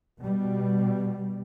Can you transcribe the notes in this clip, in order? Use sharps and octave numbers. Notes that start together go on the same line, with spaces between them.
B2 G3